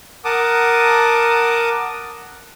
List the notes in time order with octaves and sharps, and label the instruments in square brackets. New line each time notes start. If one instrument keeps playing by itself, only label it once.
[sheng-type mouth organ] A#4 F#5 A5 D6 D#6